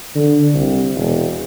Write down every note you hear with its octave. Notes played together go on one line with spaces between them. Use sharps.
D3
C2
E1